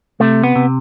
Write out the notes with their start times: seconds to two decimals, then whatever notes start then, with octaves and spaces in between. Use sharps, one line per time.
0.20 C3 A3
0.44 B3
0.56 C3